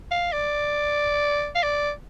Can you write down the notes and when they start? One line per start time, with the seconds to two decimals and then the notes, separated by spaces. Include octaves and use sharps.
0.11 F5
0.32 D5
1.55 F5
1.63 D5